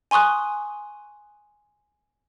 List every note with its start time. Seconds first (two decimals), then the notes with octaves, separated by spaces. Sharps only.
0.11 G#5 C6 C#6 D#6 F#6